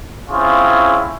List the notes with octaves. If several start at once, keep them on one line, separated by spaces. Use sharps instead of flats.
C4 C#4 E4 F4 G#4